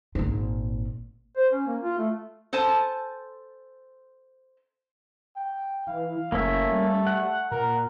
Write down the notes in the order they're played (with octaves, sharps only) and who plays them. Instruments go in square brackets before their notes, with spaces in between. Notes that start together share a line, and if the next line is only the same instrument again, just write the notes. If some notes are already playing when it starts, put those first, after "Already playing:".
[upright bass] G#1 A#2
[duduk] C5
C#4
A#3
F4
A3
[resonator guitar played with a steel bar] A4 C5 G#5 A5
[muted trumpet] G5
[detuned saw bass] E3 [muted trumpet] F5
[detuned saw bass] F#1 [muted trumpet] A3 [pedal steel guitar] A#3 C#4 E5
[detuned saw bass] G3
[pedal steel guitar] F#5
[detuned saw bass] A#2 [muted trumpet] A#4